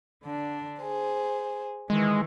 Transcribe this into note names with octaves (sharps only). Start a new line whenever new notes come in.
D3 D4
G#4 C5
D#3 E3 G#3